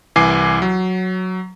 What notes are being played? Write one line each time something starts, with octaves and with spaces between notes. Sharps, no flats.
C2 E3 G#5 D6 C7
F#3